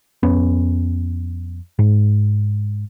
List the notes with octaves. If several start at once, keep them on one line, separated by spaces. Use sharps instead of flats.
F2 B3 C#4
G#2